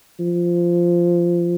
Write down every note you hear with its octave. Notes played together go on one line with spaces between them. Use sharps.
F3